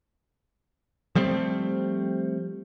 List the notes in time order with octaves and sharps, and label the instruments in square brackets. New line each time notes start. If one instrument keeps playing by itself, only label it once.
[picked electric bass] F3 G3 A3 C4